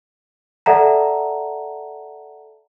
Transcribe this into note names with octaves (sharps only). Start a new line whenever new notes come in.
A4 D5 E5 F#5 A5 A#5